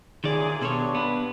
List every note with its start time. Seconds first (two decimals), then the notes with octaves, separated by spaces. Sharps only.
0.24 A1 E2 A#2 D#3 G#4 D5
0.61 G2 B2 G3 D4 A4 C#5 C6
0.95 B3 B5